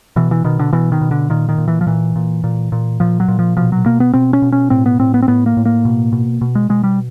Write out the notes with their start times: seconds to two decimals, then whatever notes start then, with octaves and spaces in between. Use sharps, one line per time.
0.16 B2 E3
0.31 E3
0.44 B2 D#3
0.59 D3
0.73 B2 E3
0.92 D#3
1.01 B2
1.11 D3
1.30 A#2 D#3
1.49 D#3
1.58 A#2
1.68 E3
1.81 F3
1.87 A#2 E3
2.16 A#2
2.44 A#2
2.72 A#2
3.00 A#2 F3
3.20 F#3
3.28 A#2
3.39 F3
3.57 B2 F3
3.72 F#3
3.85 B2 A#3
4.00 B3
4.14 B2 C4
4.33 C#4
4.42 B2
4.52 C#4
4.70 A2 C4
4.86 B3
4.99 A2 C4
5.14 B3
5.22 C4
5.28 A2 B3
5.46 A#3
5.57 A2
5.65 A#3
5.85 B2
6.13 B2
6.41 B2
6.55 G#3
6.69 B2 G#3
6.83 G3